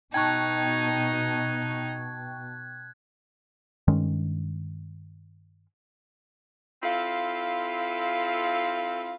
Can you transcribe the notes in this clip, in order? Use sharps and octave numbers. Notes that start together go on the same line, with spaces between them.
B2 D#4 G5 A5 C#6 F#6 G#6
G2 D#3 G#3 C#4
C4 E4 F4 A4 F5